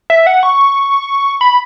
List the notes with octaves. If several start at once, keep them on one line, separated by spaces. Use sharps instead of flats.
E5
F#5
C#6
B5